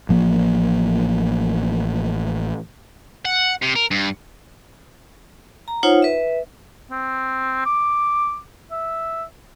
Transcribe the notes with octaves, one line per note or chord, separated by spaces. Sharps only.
A1 F3 A#3
F#5
C3
A#4
G2
A#5
D#4 F4 C5 C#5 F#5
B4 E5
C4
D6
E5